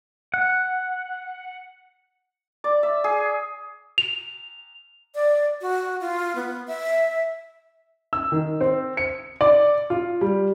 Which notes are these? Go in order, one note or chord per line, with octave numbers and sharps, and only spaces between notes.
F#5
D5
E5
G#4
F7
D5
F#4
F4
B3
E5
E6
D#3
C4
C#7
D5
F4
G3